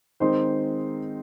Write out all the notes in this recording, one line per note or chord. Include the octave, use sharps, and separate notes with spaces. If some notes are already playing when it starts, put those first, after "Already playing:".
D#3 G#3 C4 D#4 C5 C6